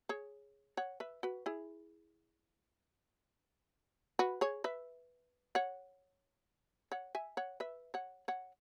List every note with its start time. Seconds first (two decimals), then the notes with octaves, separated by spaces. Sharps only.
0.09 G#4 C#5
0.77 C#5 F#5
1.00 B4 E5
1.23 F#4 B4
1.46 E4 G#4
4.19 F#4 B4
4.41 G#4 C#5
4.64 B4 E5
5.55 C#5 F#5
6.92 C#5 F#5
7.15 E5 G#5
7.37 C#5 F#5
7.60 B4 E5
7.94 C#5 F#5
8.28 C#5 F#5